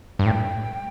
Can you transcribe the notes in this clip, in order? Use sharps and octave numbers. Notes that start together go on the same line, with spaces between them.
G2
A2 G5